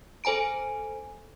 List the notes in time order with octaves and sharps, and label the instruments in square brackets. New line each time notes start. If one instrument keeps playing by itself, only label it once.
[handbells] A4 C5 G#5 A#5 D7